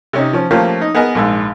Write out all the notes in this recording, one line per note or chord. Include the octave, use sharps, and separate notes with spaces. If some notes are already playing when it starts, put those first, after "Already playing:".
C3 C#4 D#4
F3 C#4
F3 A3 A#3 C#4 F4 G4
D#4
B3 G#4 A#4 D#5 G#5
A#1 G#2 E6